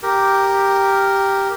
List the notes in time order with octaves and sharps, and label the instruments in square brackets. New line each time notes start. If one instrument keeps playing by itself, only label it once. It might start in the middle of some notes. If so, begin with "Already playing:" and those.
[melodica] G4 A#4